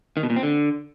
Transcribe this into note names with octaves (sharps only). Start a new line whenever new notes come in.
D#3
B2
A#2
C4
D3